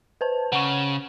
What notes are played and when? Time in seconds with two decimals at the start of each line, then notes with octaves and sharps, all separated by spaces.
0.21 B4 C5 A5
0.52 C#3 F#5 C#6